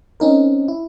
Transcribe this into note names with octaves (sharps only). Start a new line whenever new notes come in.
C4 C#4 D#4 A#4
E4